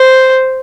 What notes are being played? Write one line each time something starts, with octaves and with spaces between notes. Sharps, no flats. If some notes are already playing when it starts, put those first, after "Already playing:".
Already playing: C5